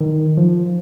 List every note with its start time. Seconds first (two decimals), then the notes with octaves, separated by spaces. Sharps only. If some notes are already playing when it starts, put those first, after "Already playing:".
0.01 D#3
0.37 F3